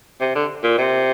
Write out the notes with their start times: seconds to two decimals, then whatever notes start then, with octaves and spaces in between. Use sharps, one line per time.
0.21 C3
0.35 D3
0.63 A#2
0.78 C3